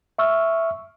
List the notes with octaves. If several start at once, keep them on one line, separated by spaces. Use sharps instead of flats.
E5 C#6 E6 F6